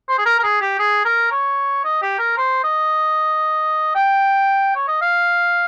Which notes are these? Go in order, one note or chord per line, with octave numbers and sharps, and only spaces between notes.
C5
G#4
A#4
A#4
G#4
G4
G#4
A#4
C#5
D#5
G4
A#4
C5
D#5
G5
C#5
D#5
F5